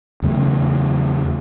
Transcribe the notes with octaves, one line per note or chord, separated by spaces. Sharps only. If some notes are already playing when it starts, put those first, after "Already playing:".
E2 C#3 F#3 A3